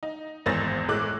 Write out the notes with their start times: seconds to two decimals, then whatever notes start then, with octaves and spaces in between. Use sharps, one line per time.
0.03 D#4
0.46 G#1 E2 C5 E6 A6 A#6
0.88 A2 G#3 D6 F#6